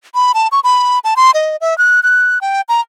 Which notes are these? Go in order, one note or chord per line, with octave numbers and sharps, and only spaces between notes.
B5
A5
C#6
B5
A5
C6
D#5
E5
F#6
F#6
G5
A#5